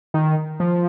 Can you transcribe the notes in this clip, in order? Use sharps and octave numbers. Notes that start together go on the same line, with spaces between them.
D#3
F3